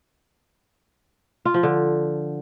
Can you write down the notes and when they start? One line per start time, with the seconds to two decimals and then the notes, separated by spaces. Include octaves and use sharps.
1.45 F4
1.54 F3
1.63 D3